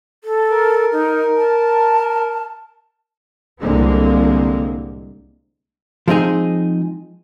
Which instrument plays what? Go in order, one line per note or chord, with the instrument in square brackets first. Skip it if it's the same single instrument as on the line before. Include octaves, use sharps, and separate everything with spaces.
[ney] A4
[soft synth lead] A#4
[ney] D#4
A5
[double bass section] C2 A2 D3 G#3 A#3 C4
[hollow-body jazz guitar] F3 G#3 C4 D#4 G#4